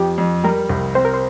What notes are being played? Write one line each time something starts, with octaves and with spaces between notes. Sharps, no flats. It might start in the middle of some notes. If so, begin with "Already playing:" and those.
Already playing: F2 F3 G4
F2
G3 A#4
C2
C4 C5
A#4
C5